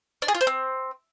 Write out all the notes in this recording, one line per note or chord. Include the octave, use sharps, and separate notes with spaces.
D4
G#4
F4
C5
C4